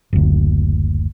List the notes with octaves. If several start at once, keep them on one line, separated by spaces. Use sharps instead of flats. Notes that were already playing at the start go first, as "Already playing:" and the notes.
F#1 D2